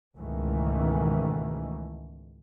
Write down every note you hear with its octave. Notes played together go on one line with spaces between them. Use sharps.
C#2 G#2 B2 D#3 E3 A3